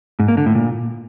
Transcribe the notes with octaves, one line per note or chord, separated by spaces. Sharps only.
G#2
A#3
D3
A2
A#2